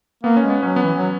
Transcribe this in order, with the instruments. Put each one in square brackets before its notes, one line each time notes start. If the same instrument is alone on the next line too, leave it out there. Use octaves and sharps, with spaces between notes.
[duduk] A#3 [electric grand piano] B3
[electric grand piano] C#4
[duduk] G#3
[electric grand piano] B3
[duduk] F#3 [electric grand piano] C#4
[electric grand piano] B3
[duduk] E3
F#3